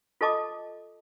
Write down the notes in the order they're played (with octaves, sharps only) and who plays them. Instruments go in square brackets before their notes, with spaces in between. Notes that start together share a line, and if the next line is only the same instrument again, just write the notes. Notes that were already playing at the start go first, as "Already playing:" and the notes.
[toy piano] F4 A4 D#5 A5 D6 D#6